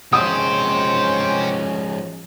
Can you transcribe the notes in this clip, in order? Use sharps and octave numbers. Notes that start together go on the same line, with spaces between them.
F#2 F3 G#3 C#4 G4 C5 D#6